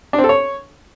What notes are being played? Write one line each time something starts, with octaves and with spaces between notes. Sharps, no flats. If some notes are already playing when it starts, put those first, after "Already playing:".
D4
C4
A4
C#5